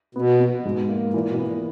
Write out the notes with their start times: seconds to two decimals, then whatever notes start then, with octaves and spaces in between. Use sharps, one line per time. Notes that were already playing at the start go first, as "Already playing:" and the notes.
0.15 B2 B3
0.40 B3
0.65 G#2
0.89 A#3
1.14 A#2 E3
1.30 B2
1.39 B3
1.48 A#2